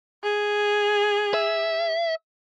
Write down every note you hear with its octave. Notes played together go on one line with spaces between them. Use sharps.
G#4
E5